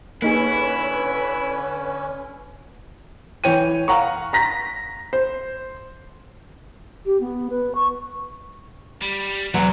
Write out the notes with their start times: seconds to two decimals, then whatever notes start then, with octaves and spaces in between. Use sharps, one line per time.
0.22 D3 A#3 C#4 D#4 E4 G#4 B4
3.44 E3 C#5 G5 D#7
3.88 F5 F#5 A#5 C#6
4.33 A#5 A#6 B6
5.13 C5
7.06 G4
7.20 B3
7.50 B4
7.75 C#6
9.02 G3
9.54 E2 C3 F#3